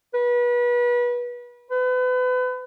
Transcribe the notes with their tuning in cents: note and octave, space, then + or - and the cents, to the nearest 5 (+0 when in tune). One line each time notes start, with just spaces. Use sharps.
B4 -30
B4 +35